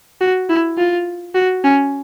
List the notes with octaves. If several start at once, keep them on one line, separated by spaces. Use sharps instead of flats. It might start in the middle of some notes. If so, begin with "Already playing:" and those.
F#4
E4
F4
F#4
C#4